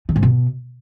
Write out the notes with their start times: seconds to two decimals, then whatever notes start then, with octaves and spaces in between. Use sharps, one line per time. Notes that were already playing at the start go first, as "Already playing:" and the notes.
0.09 D#3
0.16 G#2
0.23 B2